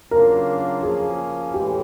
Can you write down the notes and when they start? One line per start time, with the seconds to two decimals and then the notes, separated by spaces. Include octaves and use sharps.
0.11 C#3 F#3 A#3 D4 F4 A#4
0.83 F3 A#3 C#4 G#4
1.54 A2 E3 G#3 G4